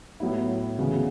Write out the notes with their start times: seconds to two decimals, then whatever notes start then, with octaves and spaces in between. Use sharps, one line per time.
0.20 A2 F#3 B3 E4
0.78 D2 C#3 E3 B3 F#4